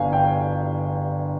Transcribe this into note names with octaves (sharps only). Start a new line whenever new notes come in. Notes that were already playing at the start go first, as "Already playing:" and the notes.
Already playing: G1 G2 F5 G#5
G5